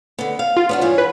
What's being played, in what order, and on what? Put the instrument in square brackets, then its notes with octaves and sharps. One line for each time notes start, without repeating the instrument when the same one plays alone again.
[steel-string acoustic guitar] D3 B3
F5
[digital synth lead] F4
[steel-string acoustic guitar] B3 D4 F#4
G2 E3 C#5
[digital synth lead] B4